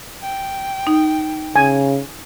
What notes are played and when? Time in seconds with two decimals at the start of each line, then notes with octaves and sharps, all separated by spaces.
0.22 G5
0.87 D#4
1.56 C#3 G#5